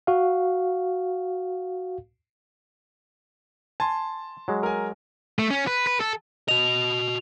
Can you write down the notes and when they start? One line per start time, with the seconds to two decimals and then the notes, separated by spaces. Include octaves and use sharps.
0.07 F#4 F5
3.80 G#5 A5 C6
4.48 F#3 G#3
4.63 A#4 G#5
5.39 A3
5.50 C#4
5.67 B4
5.87 B4
6.00 A4
6.48 F#4 D#5 F7